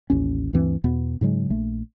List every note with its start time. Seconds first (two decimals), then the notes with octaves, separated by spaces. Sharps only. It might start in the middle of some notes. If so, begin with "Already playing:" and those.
0.10 A1 D#2 C#4
0.53 D2 G2 E3 C4
0.84 E2 B2 B3
1.21 G#2 C#3 F#3 G#3
1.50 A#1 A3